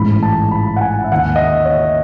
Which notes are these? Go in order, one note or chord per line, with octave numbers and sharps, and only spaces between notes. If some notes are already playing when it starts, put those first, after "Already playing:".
Already playing: A1 G#2 E3 B5
A5
B5
F#5
G#5
E5
D#2 D#3 F#5
D#5
E5
C#5
D#5